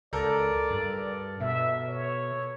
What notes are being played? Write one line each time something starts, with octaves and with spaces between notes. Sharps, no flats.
C#2 A4 A#4 D5
G2
B2 E5
C#5